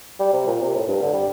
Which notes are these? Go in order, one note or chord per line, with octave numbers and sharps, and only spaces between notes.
G3
C3
A#2
C3
A2
G2
D3
G3